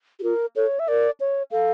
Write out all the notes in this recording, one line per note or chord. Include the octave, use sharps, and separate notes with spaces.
G4
F4 A#4
A4 C#5
E5
A#4 D5
C#5
A4 F5